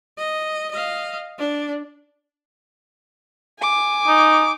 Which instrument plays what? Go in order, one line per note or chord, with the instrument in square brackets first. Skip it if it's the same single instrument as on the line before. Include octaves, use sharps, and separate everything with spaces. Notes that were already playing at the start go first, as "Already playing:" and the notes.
[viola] D#5
D#5 F5
D4
[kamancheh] G#5 D6
[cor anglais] D#4